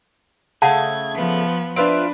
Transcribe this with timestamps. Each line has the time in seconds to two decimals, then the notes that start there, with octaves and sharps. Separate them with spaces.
0.62 C#3 A3 A4 F5 F#5 A5 G#6
1.15 F3 B3
1.76 C4 D4 F4 B4 E5 D7